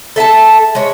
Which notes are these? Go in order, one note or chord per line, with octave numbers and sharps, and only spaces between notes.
A4 E5 G#5 A5
G#3 C#5